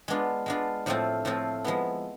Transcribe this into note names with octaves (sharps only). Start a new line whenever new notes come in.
G#3 B3 D4 F4
G#3 B3 D4 F4
A2 F3 A3 C4 F4
A2 F3 A3 C4 F4
F3 G#3 B3 E4